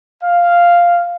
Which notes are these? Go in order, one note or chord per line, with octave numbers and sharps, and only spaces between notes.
F5